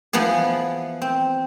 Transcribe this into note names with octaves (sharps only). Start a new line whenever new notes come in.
E3 F3 B3 E4 G#4
C4